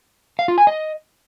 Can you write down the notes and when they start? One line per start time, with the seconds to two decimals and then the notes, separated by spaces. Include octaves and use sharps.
0.39 F5
0.48 F4
0.58 G#5
0.67 D#5